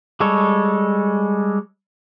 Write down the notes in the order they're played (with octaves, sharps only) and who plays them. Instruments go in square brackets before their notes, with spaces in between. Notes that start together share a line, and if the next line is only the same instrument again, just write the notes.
[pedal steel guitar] G3 G#3 A4 C#5